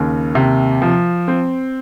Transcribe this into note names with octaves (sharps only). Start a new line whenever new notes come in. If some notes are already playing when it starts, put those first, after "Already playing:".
Already playing: D#2 C#3
C3
F3
C4